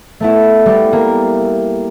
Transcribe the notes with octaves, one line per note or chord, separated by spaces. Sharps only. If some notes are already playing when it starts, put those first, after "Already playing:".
A3 B3 E4
G3 B3
A#3